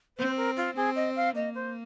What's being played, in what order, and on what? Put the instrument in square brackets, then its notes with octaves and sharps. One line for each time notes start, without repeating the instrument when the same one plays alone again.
[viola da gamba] C4 [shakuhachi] C5
[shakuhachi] A#4
F4
[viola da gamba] C4 [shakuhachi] G#4
[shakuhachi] D#5
F5
[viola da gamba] A#3 [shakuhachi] D#5
[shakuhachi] C5